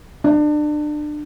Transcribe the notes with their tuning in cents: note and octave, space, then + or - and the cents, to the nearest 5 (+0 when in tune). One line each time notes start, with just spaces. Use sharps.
D4 +30